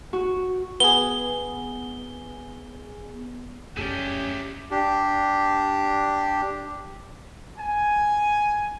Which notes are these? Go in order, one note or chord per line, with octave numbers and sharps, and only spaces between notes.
F#4
B3 G#4 G7
F1 F#2 A3 C#4 E4 G4 G#4 D5
D4 G4
G#5